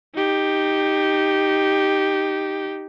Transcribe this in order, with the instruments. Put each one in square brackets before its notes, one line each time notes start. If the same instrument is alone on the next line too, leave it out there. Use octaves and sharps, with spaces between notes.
[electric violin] D#4 G4